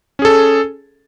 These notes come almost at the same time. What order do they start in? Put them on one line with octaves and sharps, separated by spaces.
C#4 G#4 A4